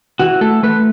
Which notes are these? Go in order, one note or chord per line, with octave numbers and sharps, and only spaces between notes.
E3 F#4
A3 A4
A3 B4